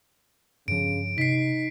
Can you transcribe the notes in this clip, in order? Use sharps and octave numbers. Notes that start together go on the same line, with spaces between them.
G2 C#3 F3 D7
C3 D#4 B6 C7